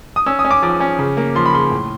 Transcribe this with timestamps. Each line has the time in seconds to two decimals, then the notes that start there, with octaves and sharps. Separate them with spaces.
0.16 D#6
0.26 C#4 E6
0.39 D#6
0.45 C#4
0.51 D6
0.62 F3 D6
0.80 C#4
0.99 C#3
1.17 A#3
1.35 F3 C6
1.46 B5
1.54 C#3 C6
1.71 A2